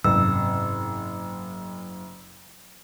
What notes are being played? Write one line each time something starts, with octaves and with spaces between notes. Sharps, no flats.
F#1 G#2 C3 E6